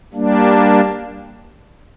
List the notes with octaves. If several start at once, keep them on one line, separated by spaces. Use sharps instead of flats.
G3 A#3 D4